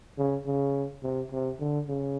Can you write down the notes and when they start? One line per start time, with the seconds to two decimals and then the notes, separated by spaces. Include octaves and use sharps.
0.18 C#3
0.46 C#3
1.03 C3
1.32 C3
1.60 D3
1.88 C#3